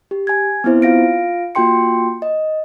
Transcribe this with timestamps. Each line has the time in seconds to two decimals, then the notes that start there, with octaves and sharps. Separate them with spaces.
0.11 G4
0.27 G#5 G#6
0.64 B3 C4 E4 C5
0.82 F4 F5 A#6 D7
1.55 A#3 F4 F#4 G5 C6 C#7
2.22 D#5